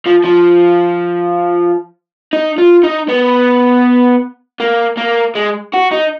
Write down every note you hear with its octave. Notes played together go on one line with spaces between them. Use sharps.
F3
F3
D#4
F4
D#4
B3
A#3
A#3
G#3
F#4
D#4